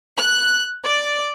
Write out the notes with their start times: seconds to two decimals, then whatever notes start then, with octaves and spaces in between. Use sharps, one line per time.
0.17 F#6
0.85 D5